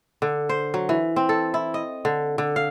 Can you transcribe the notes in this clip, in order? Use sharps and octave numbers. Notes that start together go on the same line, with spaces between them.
D3
C5
F#3
E3
C4
A4
E4
D#5
D3
D3
F5